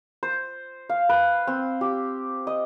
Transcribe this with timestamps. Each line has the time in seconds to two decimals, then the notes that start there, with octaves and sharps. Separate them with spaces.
0.23 C5
0.89 F5
1.09 B4
1.47 C4
1.81 G4
2.47 D#5